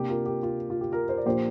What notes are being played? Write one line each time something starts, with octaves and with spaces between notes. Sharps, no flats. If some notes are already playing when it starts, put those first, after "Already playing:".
Already playing: C3 A#3 D4 G4
F4 A#4
G4
F4
F4
G4
F4 A#4
C5
D5
A#2 F3 D4 G4 C5